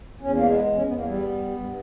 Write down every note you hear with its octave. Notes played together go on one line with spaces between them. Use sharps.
E2 C#4
A#3
G#3
B3
E2
C#4
E2 B3
A#3
G3 B3
G2
G2